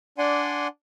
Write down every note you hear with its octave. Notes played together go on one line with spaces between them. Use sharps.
D4 D5 F#5 G#5 C6